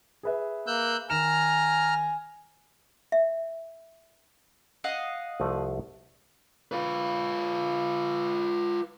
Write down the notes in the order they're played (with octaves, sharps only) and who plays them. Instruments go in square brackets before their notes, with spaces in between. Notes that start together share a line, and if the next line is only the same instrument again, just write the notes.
[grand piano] G#4 B4 E5
[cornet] A#3 [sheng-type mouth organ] E6 F#6 G6
[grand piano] D#3 E7 [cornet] G#5 [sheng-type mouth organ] A#5 F6
[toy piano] E5
[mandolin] D#5 F5 F#5
[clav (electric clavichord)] C2 F3 A3
[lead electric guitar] F4 B4